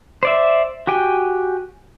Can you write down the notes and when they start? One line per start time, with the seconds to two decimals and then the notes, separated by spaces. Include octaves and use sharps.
0.23 C5 D5 E5
0.87 F#4 G4 G5 G#5